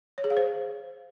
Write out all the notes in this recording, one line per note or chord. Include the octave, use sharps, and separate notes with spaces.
C#5
G#4
F5
C5